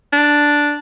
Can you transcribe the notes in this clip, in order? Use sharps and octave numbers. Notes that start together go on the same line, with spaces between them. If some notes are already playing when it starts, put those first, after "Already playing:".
D4